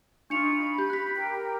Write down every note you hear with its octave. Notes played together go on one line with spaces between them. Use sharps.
D4 D#4 F4 C#6 C#7 F7
B5
G4 G6
F#6 B6
G4 A#4 G5